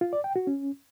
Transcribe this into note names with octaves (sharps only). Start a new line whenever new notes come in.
F4
D5
G5
F#4
C#4